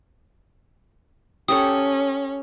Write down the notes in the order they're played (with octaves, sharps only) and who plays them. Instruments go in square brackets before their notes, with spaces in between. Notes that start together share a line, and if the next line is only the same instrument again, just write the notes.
[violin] C#4 [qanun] G4 A4 C#5 [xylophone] D#6